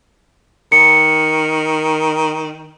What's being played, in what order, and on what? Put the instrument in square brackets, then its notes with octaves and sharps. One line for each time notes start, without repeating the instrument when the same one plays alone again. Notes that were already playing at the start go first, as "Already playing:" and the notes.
[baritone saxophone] D#3 [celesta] C#7